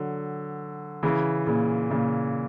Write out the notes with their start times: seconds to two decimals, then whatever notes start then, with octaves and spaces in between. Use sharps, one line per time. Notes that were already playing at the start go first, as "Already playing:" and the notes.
Already playing: D3 F#3
1.03 C#3 E3
1.47 A#2 C#3
1.90 A#2 C#3